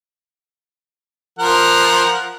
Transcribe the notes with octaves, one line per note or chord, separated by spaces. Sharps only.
F3 A#4 F#5